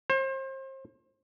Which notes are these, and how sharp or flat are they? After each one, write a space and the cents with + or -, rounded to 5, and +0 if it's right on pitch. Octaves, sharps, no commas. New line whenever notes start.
C5 +35